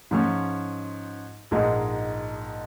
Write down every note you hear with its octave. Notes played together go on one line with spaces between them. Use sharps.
G#2 F3 C#4
A#1 G#2 G#3 D#4